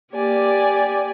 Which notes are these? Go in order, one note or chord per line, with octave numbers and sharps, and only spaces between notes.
A#3 G4 D5 G#5